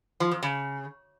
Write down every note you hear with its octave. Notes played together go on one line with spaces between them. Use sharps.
F3
F2
C#3